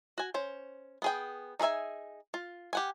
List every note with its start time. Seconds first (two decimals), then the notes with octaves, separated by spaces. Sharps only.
0.18 F#4 G#5
0.34 C#4 C5
1.02 B3 G#4 G5
1.59 D#4 G#4 A#4 E5 G#5
2.34 F4
2.73 G4 F#5 G#5